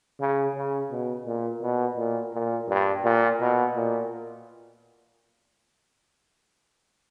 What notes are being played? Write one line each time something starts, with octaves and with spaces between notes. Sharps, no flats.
C#3
C#3
B2
A#2
B2
A#2
A#2
G2
A#2
B2
A#2